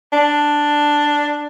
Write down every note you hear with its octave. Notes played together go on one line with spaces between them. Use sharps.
D4